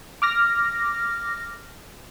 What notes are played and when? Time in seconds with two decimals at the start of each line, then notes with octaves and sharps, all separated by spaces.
0.22 D6 F6 A#6